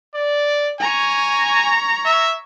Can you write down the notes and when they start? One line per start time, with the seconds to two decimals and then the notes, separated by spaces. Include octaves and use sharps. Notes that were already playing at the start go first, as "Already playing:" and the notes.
0.15 D5
0.80 C#5 G#5 A#5
2.05 E5